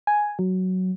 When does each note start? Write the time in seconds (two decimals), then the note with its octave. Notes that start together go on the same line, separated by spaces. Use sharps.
0.07 G#5
0.39 F#3